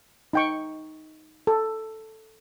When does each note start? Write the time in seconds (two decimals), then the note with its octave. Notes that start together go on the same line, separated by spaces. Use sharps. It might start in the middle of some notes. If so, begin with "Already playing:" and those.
0.33 D#4 G5 C#6
1.47 A4